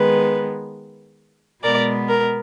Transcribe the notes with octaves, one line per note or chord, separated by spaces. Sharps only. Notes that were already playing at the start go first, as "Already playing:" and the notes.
Already playing: D#3 G#3 B3 B4
B2 G#3 B3 A#4 D5
A#4